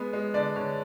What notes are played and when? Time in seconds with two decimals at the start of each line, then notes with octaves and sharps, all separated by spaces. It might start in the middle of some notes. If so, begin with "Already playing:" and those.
Already playing: G#3 B3
0.13 G#3
0.34 D3 D5
0.56 D3 C#5